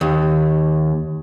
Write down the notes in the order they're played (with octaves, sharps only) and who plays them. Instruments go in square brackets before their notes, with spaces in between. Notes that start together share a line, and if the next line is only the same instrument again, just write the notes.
[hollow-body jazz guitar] D#2